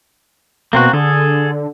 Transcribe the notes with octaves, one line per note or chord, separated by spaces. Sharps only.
B2 A#3 C4 F#4
D3 G#4 A4